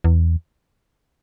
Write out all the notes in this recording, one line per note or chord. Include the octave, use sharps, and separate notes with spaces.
E2